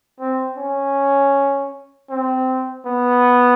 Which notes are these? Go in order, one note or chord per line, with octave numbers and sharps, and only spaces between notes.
C4
C#4
C4
B3